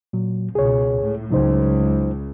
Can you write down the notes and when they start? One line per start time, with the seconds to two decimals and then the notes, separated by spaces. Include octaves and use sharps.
0.13 A#2 F#3
0.55 C#2 B2 G#4 C#5
0.99 A2
1.31 C#2 F#3 D#4 C5